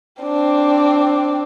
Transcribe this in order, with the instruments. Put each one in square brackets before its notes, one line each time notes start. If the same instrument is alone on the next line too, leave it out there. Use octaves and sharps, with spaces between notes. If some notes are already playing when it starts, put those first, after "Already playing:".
[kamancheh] C4 D4